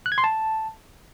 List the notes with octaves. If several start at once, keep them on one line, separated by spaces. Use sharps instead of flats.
F#6
G#6
C6
A5